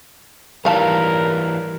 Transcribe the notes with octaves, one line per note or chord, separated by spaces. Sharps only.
D#3 E3 G3 A#4 F5 A5